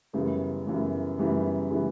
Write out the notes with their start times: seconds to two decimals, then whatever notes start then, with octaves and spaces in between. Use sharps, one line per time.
0.13 F#2 C#3 E3 G3 B3
0.66 F#2 C#3 E3 G3 B3
1.18 F#2 C#3 E3 G3 B3
1.71 C#3 E3 G3 B3